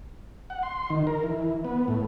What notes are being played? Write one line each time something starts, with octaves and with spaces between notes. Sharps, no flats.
F#5
C6
D#3
A#4
E3
B3
A2